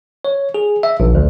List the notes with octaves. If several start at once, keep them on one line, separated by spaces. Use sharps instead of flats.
C#5
G#4
E5
A#1
D2